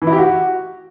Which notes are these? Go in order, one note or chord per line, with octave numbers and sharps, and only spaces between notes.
E3
E4
G4
F#4